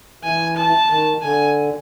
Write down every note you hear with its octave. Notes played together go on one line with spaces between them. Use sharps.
E3 G#5
A5
D#3
D3 G#5